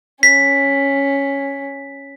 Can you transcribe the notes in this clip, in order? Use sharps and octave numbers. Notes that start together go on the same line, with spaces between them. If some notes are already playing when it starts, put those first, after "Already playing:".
C#4 B6